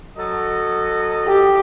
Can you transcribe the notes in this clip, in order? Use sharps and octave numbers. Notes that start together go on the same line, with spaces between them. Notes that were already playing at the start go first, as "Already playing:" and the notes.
F#3 A4 D#5
G4